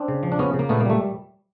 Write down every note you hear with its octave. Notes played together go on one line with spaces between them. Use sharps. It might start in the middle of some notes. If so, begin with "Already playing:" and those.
Already playing: C4 D4
C#3
F3
D4
C#3 B3 C#4
C#3
A#3
A#2 A3 B3
A#3
G3 A3